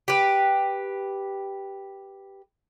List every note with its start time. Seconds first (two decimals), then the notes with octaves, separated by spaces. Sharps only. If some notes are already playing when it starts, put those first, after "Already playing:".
0.08 G4 B4